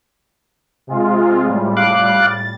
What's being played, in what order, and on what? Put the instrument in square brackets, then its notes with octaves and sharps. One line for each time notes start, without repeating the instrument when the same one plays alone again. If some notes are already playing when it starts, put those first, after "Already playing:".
[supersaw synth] C3 G#3 F4
A2 G3
[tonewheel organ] F5 D6 F#6
[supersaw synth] A6